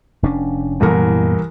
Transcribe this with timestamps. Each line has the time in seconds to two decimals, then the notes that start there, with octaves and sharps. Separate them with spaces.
0.23 F1 C#4 D4
0.81 C2 F#2 A#2 E3 B3 A#4